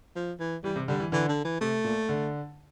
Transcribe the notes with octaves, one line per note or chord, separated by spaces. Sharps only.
F3
E3
E3 G3
C3
D3 G3
E3
D3 E3
D3
E3
C3 A3
A#2
D3